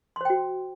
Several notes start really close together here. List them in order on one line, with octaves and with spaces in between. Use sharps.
C6 C5 G5 F#4